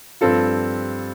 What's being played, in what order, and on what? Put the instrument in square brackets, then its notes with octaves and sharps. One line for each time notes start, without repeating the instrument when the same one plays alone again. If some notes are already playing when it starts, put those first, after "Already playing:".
[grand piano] G2 F3 C4 F4 [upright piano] A4